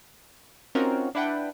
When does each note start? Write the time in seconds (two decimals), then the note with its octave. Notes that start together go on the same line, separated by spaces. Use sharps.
0.75 C4 C#4 D#4 F4 F#4 A#4
1.15 D4 E4 B4 F#5 G5